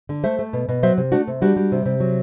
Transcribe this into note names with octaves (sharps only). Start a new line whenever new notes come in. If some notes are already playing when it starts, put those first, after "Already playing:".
D3
A3 C5 E5
A3
B2
B2
F#3 C5 E5
C3
A3 D4 F#4
C3
G3 D4 F#4
G3
C3
C3
F#3